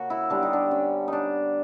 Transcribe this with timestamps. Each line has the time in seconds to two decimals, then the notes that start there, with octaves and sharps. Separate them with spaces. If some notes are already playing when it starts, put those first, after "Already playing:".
Already playing: C#3 A#3 C#4 F#4
0.10 E4
0.30 D3 G3 B3 D4
0.43 D#4
0.53 D4
0.71 C#4
1.08 D4 D#4